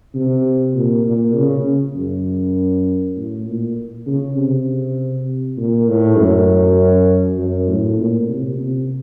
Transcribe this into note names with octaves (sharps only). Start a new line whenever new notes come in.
C3
A#2
A#2
C#3
F#2
A2
A#2
C#3
C3
A#2
A2
F#2
F#2
A2
A#2
C3
C3